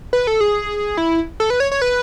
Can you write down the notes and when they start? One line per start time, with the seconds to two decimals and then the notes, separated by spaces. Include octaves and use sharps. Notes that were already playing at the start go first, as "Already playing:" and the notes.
0.13 B4
0.27 A4
0.41 G#4
0.97 E4
1.40 A4
1.50 B4
1.60 C#5
1.72 C#5
1.82 B4